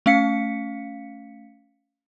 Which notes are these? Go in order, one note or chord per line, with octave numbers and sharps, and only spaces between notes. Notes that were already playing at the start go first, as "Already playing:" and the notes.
A3 C#4 F5 B6 C#7